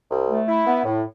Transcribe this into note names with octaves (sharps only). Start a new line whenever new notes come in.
C2
A3
E4
B3
A2